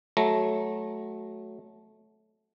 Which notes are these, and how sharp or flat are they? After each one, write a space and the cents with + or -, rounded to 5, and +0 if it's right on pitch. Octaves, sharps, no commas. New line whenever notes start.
F#3 +0 A3 -15 A#5 +0